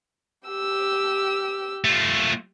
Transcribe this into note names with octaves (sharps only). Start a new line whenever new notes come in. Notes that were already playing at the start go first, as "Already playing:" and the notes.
G4 E6
A3 F4